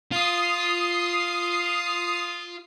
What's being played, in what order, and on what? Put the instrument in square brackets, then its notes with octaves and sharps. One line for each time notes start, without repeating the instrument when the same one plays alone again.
[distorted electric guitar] F4 [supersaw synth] D#6 C7